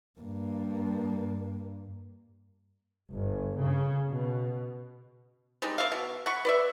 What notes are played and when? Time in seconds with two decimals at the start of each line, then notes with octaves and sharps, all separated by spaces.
0.19 G2 A#3
3.12 G1
3.60 C#3
4.10 B2
5.62 G3 G#3 D#4
5.78 A#3 C#5 E5 F5
5.92 B2
6.26 F#5 B5 C#6
6.45 B4 D5 E5